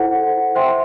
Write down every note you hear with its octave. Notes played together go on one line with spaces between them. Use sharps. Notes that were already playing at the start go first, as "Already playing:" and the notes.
Already playing: E4 A4 C5 F#5
C5 E5 G5 C6